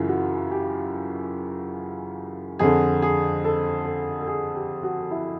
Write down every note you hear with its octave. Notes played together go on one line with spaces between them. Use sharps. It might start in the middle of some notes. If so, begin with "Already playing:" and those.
Already playing: F#2 C#3 E3 E4 F4
F#4
G4
F2 D3 G#4
G#4
A4
A4
A4
G#4
G4
F#4
E4